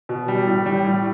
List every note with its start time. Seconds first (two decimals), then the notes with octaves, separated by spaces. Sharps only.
0.09 B2
0.28 G3
0.47 A2
0.66 G3
0.85 A2